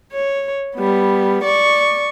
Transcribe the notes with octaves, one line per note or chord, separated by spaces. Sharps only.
C#5
G3 B3
D5 C#6